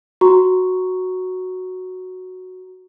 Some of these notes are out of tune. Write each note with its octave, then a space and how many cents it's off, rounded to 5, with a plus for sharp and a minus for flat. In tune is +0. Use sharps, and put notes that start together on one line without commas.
F#4 +0 A#5 +0 C#6 +0